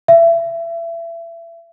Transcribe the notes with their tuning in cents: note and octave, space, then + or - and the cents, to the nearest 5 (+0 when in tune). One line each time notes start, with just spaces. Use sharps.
E5 +30